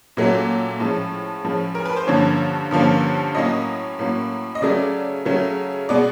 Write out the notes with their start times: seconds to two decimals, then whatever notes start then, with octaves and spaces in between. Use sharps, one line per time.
0.17 A#2 F#3 A3 C#4
0.80 A2 F3 G#3 C#4
1.44 A2 F3 G#3 C#4
1.75 A#4
1.85 B4
1.96 C5
2.07 G2 D3 F3 A#3 C#4 C#5
2.71 G2 D3 F3 A#3 C#4
3.35 A2 F#3 A#3 C#4 D#5
3.99 A2 F#3 A#3 C#4
4.55 D#5
4.62 C#3 F#3 A3 C#4 D5
5.25 C#3 F#3 A3 C#4
5.89 B2 G#3 B3 D5